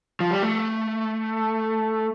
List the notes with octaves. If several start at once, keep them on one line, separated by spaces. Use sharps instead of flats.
F3
G3
A3